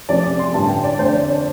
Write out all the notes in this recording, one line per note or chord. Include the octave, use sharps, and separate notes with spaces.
F1 F2 C3 F3 D5
D6
C6
A1 G2 D3 A3 A5
G5
D5
F2 D3 A3 C5
D5
D5